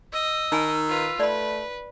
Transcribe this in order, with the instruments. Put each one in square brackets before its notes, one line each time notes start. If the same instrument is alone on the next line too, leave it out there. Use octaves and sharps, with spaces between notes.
[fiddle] D#5 [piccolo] E6
[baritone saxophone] D#3 [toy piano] D#4 G#5 B5
[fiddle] F4 B4
[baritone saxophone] A3 [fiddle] B4 [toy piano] D5 B5